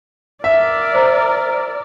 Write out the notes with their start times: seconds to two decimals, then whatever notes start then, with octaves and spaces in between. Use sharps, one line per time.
0.44 A#4 D5 E5
0.94 C5 A#5